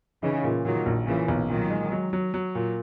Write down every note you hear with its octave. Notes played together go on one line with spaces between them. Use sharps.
C#3 E3 D#4
A#2
A#2 D#3 F#3
A#1
A#2 C#3 E3
B1
A#2 D#3 F#3
G#3
F#3
F#3
F#3
A#2